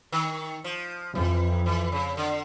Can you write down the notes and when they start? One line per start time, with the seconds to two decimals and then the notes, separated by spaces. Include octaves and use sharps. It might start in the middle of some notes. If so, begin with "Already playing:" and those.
0.12 D#3
0.64 F3
1.15 F2 E3
1.66 E3
1.92 C#3
2.17 D3